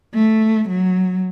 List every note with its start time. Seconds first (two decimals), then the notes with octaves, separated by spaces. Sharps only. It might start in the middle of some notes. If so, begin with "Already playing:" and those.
0.14 A3
0.68 F#3